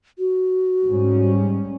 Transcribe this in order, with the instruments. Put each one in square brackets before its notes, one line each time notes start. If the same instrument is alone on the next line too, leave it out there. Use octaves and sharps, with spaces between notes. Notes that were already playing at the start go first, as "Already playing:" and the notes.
[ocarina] F#4
[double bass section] G#2 G3 C#4